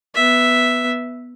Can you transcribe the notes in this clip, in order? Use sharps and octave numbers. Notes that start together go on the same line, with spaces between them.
B3 E5